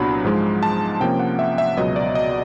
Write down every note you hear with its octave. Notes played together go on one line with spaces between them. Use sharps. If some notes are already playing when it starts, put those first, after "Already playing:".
Already playing: C2 A#2 F#3 B3 D4 B5
G#2 F3 G#3
A5
C3 F3 A#3 C#4 G5
F#5
E5
E5
C#2 B2 F#3 B3 D#5
D5
D#5